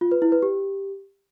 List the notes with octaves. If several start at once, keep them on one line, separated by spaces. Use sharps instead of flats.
F4
B4
E4
B4
G4